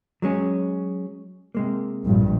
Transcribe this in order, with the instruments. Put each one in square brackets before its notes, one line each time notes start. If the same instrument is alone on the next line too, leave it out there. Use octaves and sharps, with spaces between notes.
[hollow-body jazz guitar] F#3 G#3 C#4
C3 G#3 A#3
[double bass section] A#1 G2 A#2